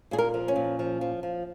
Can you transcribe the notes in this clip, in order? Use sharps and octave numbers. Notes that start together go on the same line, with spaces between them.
A#2 G#4
A#4
F3
C#4
A#2
F3
F3
F3